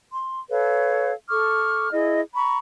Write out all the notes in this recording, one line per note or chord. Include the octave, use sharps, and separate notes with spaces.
C6
A4 B4 C#5 F5
A4 C#6 D6 F6
E4 G#4 D#5
A#5 B5 C#6